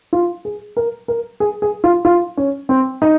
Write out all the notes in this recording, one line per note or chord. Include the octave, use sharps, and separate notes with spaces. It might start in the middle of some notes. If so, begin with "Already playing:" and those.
F4
G#4
A#4
A#4
G#4
G#4
F4
F4
C#4
C4
D#4